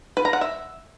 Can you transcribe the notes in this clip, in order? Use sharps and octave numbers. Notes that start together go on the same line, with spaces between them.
B4
A#5
F#5
E5